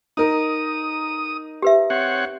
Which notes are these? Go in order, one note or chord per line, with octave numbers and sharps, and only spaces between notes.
D#4 A#4 D#6
G4 B4 E5
C4 C#5 F#5